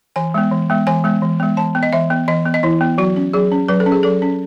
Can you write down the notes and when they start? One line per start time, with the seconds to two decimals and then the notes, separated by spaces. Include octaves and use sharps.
0.16 E3 G#5
0.34 G#3 B3
0.51 E3
0.70 G#3 B3
0.87 E3 G#5
1.04 G#3 B3
1.22 E3
1.40 G#3 B3
1.57 E3 A5
1.75 B3
1.83 D#5
1.93 E3 E5
2.10 B3
2.28 E3 D#5
2.45 B3
2.54 D#5
2.63 E3 E4
2.81 B3
2.98 F#3 F#4
3.16 C#4
3.33 F#3 G#4
3.52 C#4
3.68 F#3 B4
3.80 A4
3.86 C#4
3.92 G#4
4.03 F#3 A4
4.22 C#4